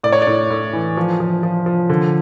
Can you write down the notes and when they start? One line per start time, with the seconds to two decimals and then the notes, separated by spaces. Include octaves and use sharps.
0.03 A2 D5
0.12 C#5
0.22 D5
0.27 A2
0.50 A2
0.73 E3
0.97 F3
1.20 F3
1.43 F3
1.66 F3
1.90 D3